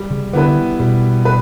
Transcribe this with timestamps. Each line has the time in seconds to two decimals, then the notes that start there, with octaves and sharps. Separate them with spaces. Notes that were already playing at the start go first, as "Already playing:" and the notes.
Already playing: G3
0.11 C#3
0.33 D3 B3 E4 G4 B4
0.80 B2 G3
1.25 B4